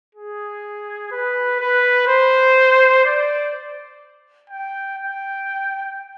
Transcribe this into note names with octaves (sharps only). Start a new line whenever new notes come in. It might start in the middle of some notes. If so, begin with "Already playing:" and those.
G#4
B4
B4
C5
D5
G5
G5